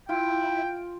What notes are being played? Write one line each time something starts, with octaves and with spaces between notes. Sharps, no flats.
E4 F4 G5